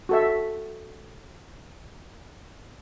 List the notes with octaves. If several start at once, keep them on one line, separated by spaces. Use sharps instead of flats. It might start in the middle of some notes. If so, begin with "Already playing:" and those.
F#4 A4 E5